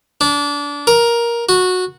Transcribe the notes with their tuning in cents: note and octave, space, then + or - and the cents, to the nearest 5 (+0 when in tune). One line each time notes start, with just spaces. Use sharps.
D4 -25
A#4 +10
F#4 -15